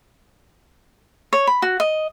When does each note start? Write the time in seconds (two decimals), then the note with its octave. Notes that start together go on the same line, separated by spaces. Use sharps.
1.33 C#5
1.47 B5
1.62 F#4
1.80 D#5